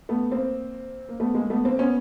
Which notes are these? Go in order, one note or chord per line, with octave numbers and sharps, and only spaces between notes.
A3 B3
A#3 C4
A#3
A3 B3
G#3 A#3
A3 B3
A#3 C4
B3 C#4